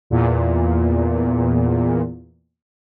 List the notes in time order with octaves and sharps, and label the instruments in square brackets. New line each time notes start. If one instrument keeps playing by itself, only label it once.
[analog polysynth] E2 A#2